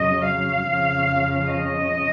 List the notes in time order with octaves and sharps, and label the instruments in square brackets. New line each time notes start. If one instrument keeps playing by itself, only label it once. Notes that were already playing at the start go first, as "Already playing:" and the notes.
Already playing: [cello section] F2 C#3 F#3 D#5
F5
F2 C#3 F3
D#5